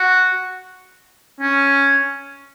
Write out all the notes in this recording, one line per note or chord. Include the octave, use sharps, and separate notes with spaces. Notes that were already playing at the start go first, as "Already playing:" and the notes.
Already playing: F#4
C#4